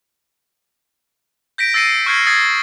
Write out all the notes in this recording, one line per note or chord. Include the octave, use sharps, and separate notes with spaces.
G6 A#6 B6 D7
E6 A6 A#6 C7 C#7 D#7
C#6 F6 G6 G#6 C7 C#7
D#6 G#6 A6 C7